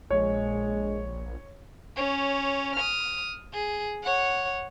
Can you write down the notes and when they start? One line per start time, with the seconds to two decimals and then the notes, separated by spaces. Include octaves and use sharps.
0.11 A#1 G#3 C#5
1.96 C#4 C#5
2.76 D#6 F6
3.54 G#4
4.03 C#5 F#5